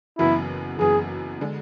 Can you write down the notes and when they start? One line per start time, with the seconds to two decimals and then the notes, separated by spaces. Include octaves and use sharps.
0.18 F#1 F#2 E3 B3 E4
0.79 F#1 F#2 E3 B3 G#4
1.41 D3 G#3